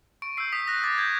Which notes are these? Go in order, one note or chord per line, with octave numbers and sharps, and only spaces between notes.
C#6 D7
E6 G6 C7
D#6 B6
F#6 A#6
D6 A6
G6 G#6